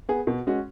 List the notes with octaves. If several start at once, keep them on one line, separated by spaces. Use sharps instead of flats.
B3 G#4
B2
G#3 C#4 F#4